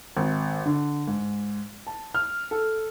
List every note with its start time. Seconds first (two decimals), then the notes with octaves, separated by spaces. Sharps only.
0.17 G#1
0.66 D3
1.07 G#2
1.87 A5
2.15 F6
2.51 A4